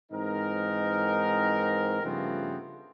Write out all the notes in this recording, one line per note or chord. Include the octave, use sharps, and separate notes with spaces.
G#2 E3 C4 D#4 A#4
G2 C#3 F3 A3 B3 C4